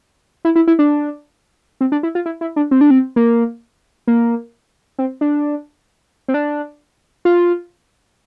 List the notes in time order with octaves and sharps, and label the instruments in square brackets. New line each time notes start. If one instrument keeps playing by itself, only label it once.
[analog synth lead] E4
E4
E4
D4
C4
D4
E4
F4
E4
E4
D4
C4
D4
C4
A#3
A#3
C4
D4
C4
D4
F4